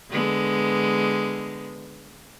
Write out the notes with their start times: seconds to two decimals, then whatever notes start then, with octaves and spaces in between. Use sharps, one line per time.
0.10 D3 G#3 B3